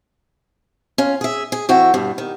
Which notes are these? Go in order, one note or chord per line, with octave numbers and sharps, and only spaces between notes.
C#4 F4
G#4 E5
G#4
F2 E4 F#4 G5
G2 B2
D#3